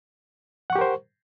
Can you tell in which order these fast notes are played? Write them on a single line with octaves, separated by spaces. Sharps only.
F#5 C#6 G4 A#4 C5